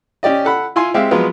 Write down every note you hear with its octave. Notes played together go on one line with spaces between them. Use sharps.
C#4 G4 D5 D#5
A4 F#5 B5
E4 F4 G#5 C6
G#3 C4 G4 E5 F5
F3 F#3 G#3 B3 F4